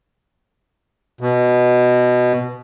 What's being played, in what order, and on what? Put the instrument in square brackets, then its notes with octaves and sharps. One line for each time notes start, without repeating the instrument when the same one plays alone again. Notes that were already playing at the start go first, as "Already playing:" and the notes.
[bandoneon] B2